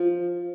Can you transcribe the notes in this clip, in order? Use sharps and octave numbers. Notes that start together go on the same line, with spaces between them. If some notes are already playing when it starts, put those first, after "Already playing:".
Already playing: F3